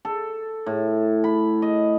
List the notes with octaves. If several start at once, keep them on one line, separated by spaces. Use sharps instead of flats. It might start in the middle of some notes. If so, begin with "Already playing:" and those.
A4
A2
B5
D#5